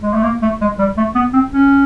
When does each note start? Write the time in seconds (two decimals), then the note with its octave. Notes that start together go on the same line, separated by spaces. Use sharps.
0.02 G#3
0.14 A3
0.23 A#3
0.42 A3
0.61 G#3
0.79 G3
0.97 A3
1.15 B3
1.33 C4
1.52 C#4